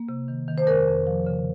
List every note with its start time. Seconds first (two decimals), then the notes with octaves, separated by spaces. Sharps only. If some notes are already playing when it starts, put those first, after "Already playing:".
Already playing: A#3
0.09 C3
0.28 D#3
0.48 D#3
0.58 C5
0.67 F2 A#4
0.88 F2
1.07 F3
1.26 C#3